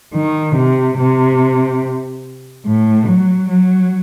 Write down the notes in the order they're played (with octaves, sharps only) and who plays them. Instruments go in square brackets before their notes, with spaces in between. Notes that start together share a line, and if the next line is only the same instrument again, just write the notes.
[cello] D#3
C3
C3
A2
F#3
F#3